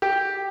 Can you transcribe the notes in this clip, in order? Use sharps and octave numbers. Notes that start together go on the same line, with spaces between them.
G4